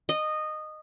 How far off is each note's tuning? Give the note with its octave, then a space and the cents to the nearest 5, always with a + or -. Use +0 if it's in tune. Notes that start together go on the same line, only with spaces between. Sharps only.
D#5 -15